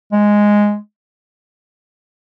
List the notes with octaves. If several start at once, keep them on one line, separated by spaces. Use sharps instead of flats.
G#3